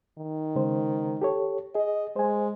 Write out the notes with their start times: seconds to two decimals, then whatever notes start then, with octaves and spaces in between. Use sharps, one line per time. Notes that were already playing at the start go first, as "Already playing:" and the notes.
0.18 D#3
0.56 C#3 G#3 C5
1.22 G4 A4 C#5
1.75 G#4 D#5
2.16 G#3 C5 G#5